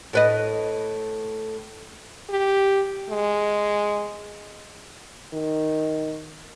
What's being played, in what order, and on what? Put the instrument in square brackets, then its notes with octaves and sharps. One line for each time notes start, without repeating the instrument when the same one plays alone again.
[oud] A2 B4 D#5
[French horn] G4
G#3
D#3